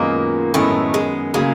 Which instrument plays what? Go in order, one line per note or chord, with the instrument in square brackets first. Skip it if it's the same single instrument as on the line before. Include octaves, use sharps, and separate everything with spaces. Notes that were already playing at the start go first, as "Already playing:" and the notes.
Already playing: [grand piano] F#2 D#3 G#3 B3 [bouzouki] A#2 A#3
[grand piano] F#2 D#3 G#3 B3 [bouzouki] A2 A3
[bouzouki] G#3
[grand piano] C#3 F#3 A#3 [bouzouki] G#3